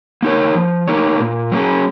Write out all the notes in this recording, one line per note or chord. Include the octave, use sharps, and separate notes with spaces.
A#3 D#4 A#4 C#5
F3
A#3 D#4 A#4 C#5
A#2
F#3 A#3 C#4 G#4